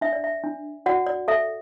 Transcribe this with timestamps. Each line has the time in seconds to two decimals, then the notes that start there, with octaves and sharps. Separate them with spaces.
0.01 D4 E5
0.13 D5
0.24 E5
0.44 D4
0.86 F#4 D5 F#5
1.07 D5
1.28 A4 E5